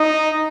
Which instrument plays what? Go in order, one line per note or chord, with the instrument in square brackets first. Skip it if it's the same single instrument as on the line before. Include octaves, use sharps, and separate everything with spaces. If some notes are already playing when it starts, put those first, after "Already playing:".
Already playing: [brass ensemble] D#4